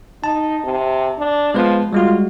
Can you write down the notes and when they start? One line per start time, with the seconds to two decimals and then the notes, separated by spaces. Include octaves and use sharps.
0.24 D#4 A5
0.64 C3
1.19 D4
1.54 F3 G#3 B3 B4
1.93 G3 G#3 F4 F#4